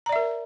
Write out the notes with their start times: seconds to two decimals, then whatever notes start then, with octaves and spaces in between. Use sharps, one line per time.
0.06 A#5
0.09 D5
0.13 E5
0.16 A#4